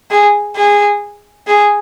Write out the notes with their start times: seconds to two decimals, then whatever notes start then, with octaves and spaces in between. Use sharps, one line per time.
0.11 G#4
0.56 G#4
1.47 G#4